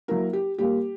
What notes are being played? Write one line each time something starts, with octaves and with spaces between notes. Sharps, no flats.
F#3 A#3 E4 A#4
G4
A#2 G3 A#3 G4